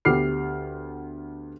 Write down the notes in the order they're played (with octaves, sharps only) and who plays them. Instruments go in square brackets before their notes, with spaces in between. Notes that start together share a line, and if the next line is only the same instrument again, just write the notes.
[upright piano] D2 B3 G4 D6 F6 C7